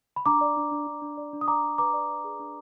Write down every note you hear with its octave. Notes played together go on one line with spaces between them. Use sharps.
B5
D4 A#5 D6
D5
D4
D4
D4
D4
D5
D4
D#6
D5 A#5 D6
D4
B4 A#5 D6
D5
D5
G#4
D4